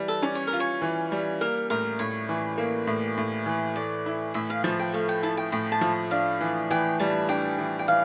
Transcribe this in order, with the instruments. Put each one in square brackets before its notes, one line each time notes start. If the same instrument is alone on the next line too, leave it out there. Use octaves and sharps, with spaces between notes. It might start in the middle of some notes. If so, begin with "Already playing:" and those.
Already playing: [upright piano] E3 G3
[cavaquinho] A4
[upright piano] C#4 [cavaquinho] D5
[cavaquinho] C#5
A#4
[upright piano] F4
[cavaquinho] C#5
[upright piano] E3
G3
[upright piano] A#3 [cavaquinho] A#4
[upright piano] A2 [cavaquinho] A#4
[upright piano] A2 [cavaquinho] C#5
[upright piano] E3
A#3
A2
A2
E3
[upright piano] A3 [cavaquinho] D5
[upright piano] E4
[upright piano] A2 [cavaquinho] E5
[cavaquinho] F5
[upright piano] F3 [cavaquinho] A5
[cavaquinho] G5
[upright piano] A3 [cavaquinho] F5
[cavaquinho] G5
[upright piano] E4 [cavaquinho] A5
[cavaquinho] G5
[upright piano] A2 [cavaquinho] G5
[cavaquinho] A5
[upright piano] F3
[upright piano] D4 [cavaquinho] F5
[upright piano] E3
[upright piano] E3 [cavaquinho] G5
[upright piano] G3 [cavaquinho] A5
[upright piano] D4 [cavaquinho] G5
[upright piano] E3
[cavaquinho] G5
[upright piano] E3 [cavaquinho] F5